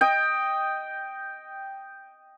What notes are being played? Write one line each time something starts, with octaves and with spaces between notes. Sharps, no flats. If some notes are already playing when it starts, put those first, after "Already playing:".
D#5 G5